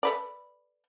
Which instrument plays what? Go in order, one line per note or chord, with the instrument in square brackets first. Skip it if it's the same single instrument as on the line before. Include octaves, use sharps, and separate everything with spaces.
[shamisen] A4 B4 D5